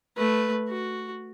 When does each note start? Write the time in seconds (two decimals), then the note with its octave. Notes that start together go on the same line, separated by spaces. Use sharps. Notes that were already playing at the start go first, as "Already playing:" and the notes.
0.17 A3 B4
0.69 F#4